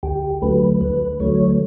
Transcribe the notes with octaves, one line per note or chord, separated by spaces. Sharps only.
D2 G4
D3 F#3 A3 B4
D2 B4
D3 F#3 A3 C#5